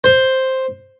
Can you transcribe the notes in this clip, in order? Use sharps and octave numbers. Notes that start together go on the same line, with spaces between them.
C5